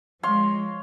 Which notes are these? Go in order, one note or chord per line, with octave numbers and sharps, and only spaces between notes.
F3 G#3 C#5 F5 C6